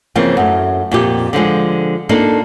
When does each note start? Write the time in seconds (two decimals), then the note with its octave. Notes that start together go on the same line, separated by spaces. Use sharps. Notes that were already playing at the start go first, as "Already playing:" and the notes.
0.15 C#3 E3 F3 A#3 C4
0.37 F#2 A3
0.91 F2 A#2 G4
1.33 D3 F3 F#3 G#3
2.09 A#3 D4 D#4 F4 A4